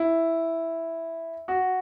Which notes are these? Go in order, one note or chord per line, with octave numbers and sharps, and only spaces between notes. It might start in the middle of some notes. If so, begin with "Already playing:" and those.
Already playing: E4
F#4